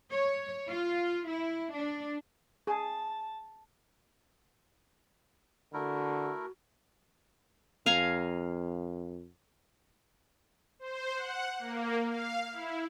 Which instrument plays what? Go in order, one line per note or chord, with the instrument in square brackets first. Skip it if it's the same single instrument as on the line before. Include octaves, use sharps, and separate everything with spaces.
[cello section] C#5
F4
E4
D4
[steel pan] G#4 [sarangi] A5
[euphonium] D3 [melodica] A3 E4 A#4 [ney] F#4
[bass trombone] F2 [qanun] F5 G#5 A#5
[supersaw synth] C5
F#5
A#3
F5
E4